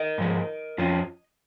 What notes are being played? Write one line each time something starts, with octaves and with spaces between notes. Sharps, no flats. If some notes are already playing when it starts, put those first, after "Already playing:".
Already playing: A#4 D#5
G#2 F3 G#3
F2 F3 C#4